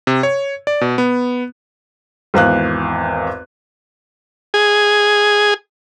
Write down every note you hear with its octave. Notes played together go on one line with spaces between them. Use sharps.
C3
C#5
D5
B2
B3
G#1 E2 F5 F#6
G#4